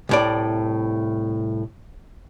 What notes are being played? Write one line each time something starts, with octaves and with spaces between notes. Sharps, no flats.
C2 A2 D5